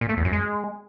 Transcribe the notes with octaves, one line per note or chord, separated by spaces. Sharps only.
A#2
A3
E2
F#2
G#3